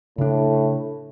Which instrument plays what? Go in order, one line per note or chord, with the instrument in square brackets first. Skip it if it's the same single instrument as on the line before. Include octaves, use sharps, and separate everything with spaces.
[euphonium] A2 [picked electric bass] C#3 D4